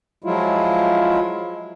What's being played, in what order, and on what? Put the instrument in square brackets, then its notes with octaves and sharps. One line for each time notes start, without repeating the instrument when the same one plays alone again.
[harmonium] F3 F#3 G#3 E4 F4